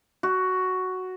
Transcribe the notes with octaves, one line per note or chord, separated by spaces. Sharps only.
F#4